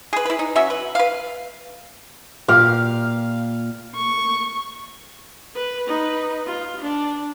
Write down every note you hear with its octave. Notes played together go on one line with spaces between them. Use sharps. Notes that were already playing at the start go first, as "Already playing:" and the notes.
G#4 B4
E4 B4
D#4
F#3 C#4 F#4 E5
B4
B4 F5
A#2 G4 F5
C#6
B4
D#4 B4
F4
D4